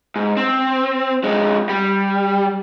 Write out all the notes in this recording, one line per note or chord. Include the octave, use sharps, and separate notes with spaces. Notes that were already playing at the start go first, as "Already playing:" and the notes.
G#2
C4
F2 G#3
G3